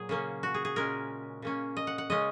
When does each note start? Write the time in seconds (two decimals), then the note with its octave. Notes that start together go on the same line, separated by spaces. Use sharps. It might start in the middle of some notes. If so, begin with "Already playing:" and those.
Already playing: A#2 F#3 G#4
0.09 C#3 A#3 C#4
0.43 F#4
0.54 G#4
0.65 G#4
0.76 A#2 G#3 C#4 A#4
1.42 C#3 A#3 C#4
1.77 D#5
1.87 F#5
1.98 F#5
2.10 C#3 G#3 C#4 D#5